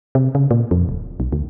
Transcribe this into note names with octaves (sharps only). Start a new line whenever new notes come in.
C3
C#3
A#2
F2
D1
B1
D2